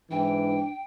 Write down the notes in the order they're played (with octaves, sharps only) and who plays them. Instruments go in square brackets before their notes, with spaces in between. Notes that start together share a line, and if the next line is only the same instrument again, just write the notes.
[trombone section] G#2 E3 [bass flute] D4 [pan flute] G5